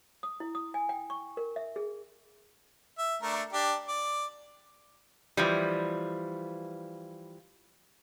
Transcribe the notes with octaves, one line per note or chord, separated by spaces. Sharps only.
D#6
E4
D#6
G#5
G5
C#6
A#4
E5
G#4
E5
A3 D4 A#4
D4 G4
D5
E3 F3 G3